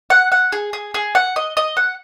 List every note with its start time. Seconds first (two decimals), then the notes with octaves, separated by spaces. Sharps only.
0.10 F#5
0.32 F#5
0.52 G#4
0.73 G#4
0.94 G#4
1.15 F#5
1.36 D#5
1.57 D#5
1.77 F#5